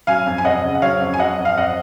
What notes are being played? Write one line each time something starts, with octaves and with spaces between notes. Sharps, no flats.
F#3 F5 G#5
F2
G#5
F2 D#5 F#5
C#3
F#5
F#3 C#5 F5
F2
G#5
F#3 D#5 F#5
F2
F5
F2 D#5 F#5